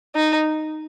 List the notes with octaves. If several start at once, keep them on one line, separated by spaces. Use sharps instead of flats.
D#4